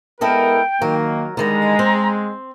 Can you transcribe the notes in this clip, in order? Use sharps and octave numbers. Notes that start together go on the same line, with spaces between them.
G#3 B3 E4 A4 A#4 D#5 G5
D#3 F#3 A#3 A#4
D3 D#3 G3 G#3 A#5
C4